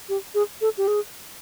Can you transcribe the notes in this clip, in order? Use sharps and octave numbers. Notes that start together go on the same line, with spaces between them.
G4
G#4
A4
G4
G#4